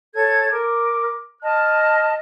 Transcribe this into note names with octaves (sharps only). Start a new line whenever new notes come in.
A4 C#5 G#6
A#4 D6
D#5 A5 F6